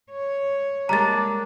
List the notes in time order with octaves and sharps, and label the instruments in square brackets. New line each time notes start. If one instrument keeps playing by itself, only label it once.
[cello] C#5
[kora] G3 G#3 A#3 [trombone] D4 [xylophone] A#5 A6